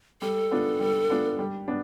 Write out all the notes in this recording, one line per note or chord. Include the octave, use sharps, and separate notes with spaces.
G3 A4
B3 D4 F4
G3
B3 D4 F4
G3
B3 D4